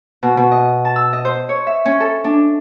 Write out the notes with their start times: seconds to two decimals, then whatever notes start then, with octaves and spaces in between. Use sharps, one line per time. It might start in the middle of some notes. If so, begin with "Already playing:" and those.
0.23 B2
0.37 B2
0.52 D#5
0.85 A5
0.96 E6
1.13 D#5
1.25 C5
1.49 C#5
1.67 E5
1.85 C#4
2.00 A4
2.24 D4